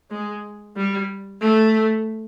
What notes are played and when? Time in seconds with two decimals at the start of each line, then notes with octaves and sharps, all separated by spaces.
0.11 G#3
0.76 G3
1.41 A3